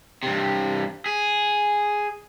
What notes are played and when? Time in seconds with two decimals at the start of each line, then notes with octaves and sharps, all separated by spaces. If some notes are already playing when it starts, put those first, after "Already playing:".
0.23 G2 C3
1.06 G#4